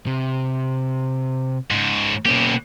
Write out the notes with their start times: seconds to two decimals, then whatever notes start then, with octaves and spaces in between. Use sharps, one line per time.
0.07 C3
1.71 G#2 C#3
2.26 B2 A#3 C#4 G4